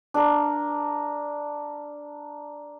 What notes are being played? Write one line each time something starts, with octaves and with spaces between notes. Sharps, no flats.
D4 A#4